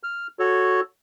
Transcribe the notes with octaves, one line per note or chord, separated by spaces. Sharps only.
F6
F#4 A4 C#5